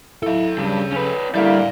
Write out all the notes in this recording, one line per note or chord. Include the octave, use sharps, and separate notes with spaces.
E4 A4 F5
G2 C#3 G3
C#4 B4
D3 G3 A3 A#3 E4 D5 F5